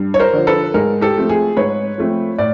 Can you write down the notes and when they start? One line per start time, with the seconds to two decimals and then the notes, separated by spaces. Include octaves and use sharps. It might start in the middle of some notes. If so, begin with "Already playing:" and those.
Already playing: G2
0.14 C#5
0.20 A#4 C5
0.33 D3 F3
0.47 A4 B4
0.74 G#2 G#4 A#4
1.01 G4 A4
1.16 F3 A3 C4
1.29 G#4
1.57 G#2 B4 C#5
1.98 F3 A3 C4
2.38 A2 D5